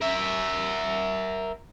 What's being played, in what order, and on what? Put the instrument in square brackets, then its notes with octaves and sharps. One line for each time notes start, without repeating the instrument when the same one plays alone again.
[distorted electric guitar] A#4 E5